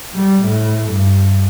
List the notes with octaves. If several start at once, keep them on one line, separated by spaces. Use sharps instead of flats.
G3
A2
G2